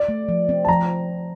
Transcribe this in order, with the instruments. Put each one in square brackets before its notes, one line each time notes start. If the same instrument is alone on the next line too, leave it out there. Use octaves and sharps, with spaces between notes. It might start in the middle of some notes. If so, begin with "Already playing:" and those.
Already playing: [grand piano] D5
[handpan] A3
F3
C4
[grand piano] A5
[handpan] F3 [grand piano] A#5